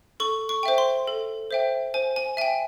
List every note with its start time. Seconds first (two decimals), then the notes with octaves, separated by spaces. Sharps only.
0.20 A4 C#6
0.49 C#6
0.63 C5 E5 G5
0.78 C6
1.07 A4
1.51 C5 E5 G5
1.94 C5 G#5
2.16 G#5
2.37 E5 G5 G#5